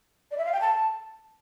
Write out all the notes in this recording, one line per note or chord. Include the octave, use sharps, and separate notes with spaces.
D5
E5
F5
G5
A5